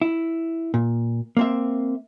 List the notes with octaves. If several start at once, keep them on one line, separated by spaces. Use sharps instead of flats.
E4
A#2
A#3 C4 E5